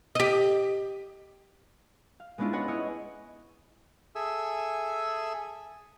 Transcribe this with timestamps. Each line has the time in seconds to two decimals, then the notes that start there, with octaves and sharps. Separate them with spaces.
0.15 G4 D#5
2.20 F5
2.38 G#3 B3 C#4 D4 E4 F4
2.53 B4 C#5 D#5 F#5 G#5
2.68 E4 C#5 D#5
4.15 G#4 A4 E5 G#5 E6